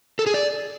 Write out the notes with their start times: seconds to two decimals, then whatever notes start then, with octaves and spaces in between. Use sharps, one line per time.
0.19 A4
0.27 G#4
0.34 D5